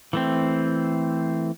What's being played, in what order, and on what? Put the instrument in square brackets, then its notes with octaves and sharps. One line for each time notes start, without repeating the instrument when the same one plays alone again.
[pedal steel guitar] E3 A3 C4